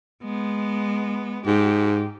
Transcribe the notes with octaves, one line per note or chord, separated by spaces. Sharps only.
G#3 B3
G#2 G4